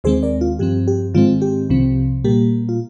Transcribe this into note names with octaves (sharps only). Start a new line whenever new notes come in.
D#2 D#3 G#3 C4 G#4 C5
A#4 D5
F4
G2 F3 C4 G4
G4
G#2 D#3 G#3 C4 F4
G4
C2 C3 F3 C4
A#2 G3 A#3 G4
F4